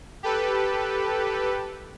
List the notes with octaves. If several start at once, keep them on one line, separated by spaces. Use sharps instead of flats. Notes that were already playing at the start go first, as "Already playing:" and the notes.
G4 A4 B4